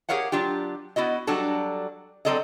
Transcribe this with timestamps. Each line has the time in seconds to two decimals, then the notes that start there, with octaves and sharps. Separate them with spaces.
0.09 G4 G#4 A#4 C#5 F5 F#5
0.32 F#3 D4 F4 G4
0.96 B3 E4 F#4 D#5
1.27 F#3 G3 D4 F#4 A4
2.25 F#3 G3 C4 A4 D5 D#5